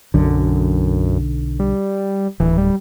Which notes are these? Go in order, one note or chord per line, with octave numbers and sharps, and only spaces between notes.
B1 F#2 D3
G3
D1 E3
G3